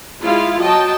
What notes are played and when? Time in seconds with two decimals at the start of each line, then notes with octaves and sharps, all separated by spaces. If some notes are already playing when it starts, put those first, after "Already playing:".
0.20 G#3 E4 F4 F5
0.62 F#3 D#5 G5 A5